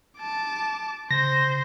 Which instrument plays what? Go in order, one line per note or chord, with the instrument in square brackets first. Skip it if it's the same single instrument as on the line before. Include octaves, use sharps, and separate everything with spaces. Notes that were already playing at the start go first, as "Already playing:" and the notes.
[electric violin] A5 D6
[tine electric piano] C#3 [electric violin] C5 [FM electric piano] A#6